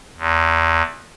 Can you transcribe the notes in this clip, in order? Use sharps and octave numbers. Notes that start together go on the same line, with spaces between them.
E2